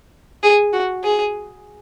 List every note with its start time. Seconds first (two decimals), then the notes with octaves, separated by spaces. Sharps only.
0.43 G#4
0.73 F#4
1.03 G#4